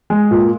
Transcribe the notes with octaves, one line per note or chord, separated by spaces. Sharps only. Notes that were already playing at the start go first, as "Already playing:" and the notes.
G#3
A#2